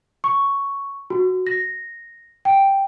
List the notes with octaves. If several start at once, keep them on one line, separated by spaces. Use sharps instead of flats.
C#6
F#4
A#6
G5